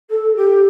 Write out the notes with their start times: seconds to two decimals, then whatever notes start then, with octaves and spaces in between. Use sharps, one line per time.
0.10 A4
0.36 G4